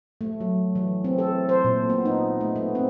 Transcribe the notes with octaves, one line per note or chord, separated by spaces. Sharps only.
A3
F#3
E3
C4
A4
C5
A#2
B3
D#4
A3
B3
C4